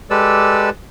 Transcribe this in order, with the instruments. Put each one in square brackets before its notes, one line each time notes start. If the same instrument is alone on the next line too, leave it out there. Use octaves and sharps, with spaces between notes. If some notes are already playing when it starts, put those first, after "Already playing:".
[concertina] G#3 G4 A4 B4 D5 E6